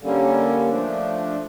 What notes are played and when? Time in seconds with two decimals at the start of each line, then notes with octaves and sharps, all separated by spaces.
0.01 D3 G3 A#3 C#4
0.68 F3 A3 D4